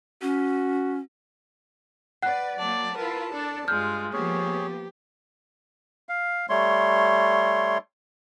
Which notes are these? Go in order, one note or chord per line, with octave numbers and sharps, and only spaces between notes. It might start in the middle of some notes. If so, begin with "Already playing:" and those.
C#4 F#4
B4 D5 F#5 F#6
F#3 A#3 D5 A5
E4 F4 A#4 B4
D4 A4 D5
G2 G#3 F4 F6 G6
F3 A#3 B3 G4 G#4 C#5
F5
G3 A3 C#5 C6